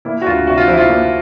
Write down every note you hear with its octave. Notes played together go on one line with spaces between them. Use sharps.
A#3 E4
F#4
D2 F4
C3 F#4
F4
F3 E4
F4
A#3